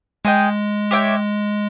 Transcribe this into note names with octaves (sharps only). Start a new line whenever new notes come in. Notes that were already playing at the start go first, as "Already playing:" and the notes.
G#3 G#4 D#5 G5
G4 C#5 E5 G5